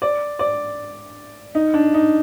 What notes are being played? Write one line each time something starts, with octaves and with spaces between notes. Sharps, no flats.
D5
D5
D#4
D4
D#4